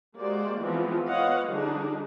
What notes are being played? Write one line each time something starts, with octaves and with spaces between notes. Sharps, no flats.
G#3 A#3 F#4 G4 C5 D5
E3 F3 G#3 B3 C4 F4
B3 C5 C#5 D#5 F5 F#5
D3 F3 G3 D4 D#4 G#4